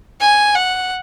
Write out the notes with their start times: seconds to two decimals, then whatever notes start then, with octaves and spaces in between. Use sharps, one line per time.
0.20 G#5
0.55 F#5